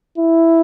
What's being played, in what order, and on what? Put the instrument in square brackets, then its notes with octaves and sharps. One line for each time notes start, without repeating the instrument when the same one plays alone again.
[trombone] E4